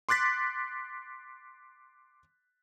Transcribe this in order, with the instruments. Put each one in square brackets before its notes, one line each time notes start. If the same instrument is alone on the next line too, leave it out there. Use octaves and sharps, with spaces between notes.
[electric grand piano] C6 D6 F#6 A6 B6